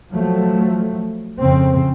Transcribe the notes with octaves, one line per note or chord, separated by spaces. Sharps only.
F3 F#3 A3
F2 C#3 C4